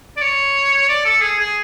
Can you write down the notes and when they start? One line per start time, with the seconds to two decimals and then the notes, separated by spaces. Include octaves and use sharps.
0.17 D5
0.22 C#5
0.89 D5
1.05 A4
1.22 G#4
1.39 G#4